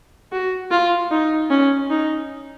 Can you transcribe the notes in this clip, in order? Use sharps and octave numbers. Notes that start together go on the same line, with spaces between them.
F#4
F4
D#4
C#4
D#4